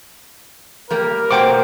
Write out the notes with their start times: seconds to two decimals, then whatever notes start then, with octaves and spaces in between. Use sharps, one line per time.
0.90 G3 A#3 G4 A#4
1.31 B2 A#3 C5 F#5 G5 D6